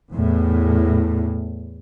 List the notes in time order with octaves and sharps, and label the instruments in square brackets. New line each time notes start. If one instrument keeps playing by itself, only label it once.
[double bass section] E2 A2